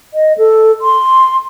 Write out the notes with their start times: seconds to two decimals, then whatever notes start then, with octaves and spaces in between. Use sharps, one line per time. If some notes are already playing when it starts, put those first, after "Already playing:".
0.14 D#5
0.38 A4
0.82 C6